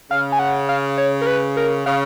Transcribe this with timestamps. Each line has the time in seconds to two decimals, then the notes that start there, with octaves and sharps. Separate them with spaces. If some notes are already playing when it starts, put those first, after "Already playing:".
0.10 C#3 F5
0.32 G#5
0.39 F#5
0.69 F5
0.98 C#5
1.21 A#4
1.27 B4
1.57 A#4
1.86 C#3 F5